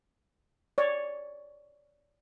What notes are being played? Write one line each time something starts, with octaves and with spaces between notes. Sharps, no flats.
C#5 D5